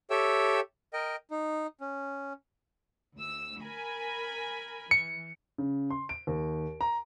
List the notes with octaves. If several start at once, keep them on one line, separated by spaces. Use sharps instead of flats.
G4 A4 C#5 E5 G5 E6
A#4 D#5 G5
D#4
C#4
D2 E6
A#4 G#5 B5
E3 C#7
C#3
C6
D7
D#2
A#5